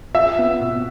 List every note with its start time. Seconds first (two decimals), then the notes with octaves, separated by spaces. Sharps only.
0.15 F4 E5
0.38 B3
0.61 B2